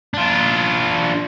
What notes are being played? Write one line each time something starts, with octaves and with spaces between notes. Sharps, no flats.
D4 F4